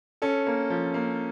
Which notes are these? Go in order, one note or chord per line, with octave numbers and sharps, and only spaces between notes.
C#4 A4
A#3
F3
A#3